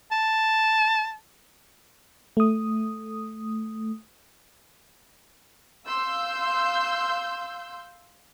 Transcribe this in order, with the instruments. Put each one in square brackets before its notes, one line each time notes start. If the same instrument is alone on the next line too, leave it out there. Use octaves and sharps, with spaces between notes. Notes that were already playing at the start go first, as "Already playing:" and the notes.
[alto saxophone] A5
[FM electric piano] A3 D#6
[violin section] F5 C6 E6 G6